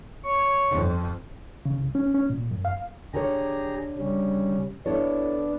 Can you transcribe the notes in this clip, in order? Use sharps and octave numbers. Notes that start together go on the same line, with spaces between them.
C#5 C#6
F2
C#3
C2
C#4
C#4
A#2
F#2
F5
D3 G4 G#4 A#4 C#5 A#5
C#3 G3 C#4
B3 D4 E4 A4 C#5